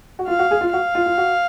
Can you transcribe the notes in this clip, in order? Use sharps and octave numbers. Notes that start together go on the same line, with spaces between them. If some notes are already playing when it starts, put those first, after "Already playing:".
F#4
F4 F5
F#4
G#4
F4
F#4 F5
F4
F4
F#4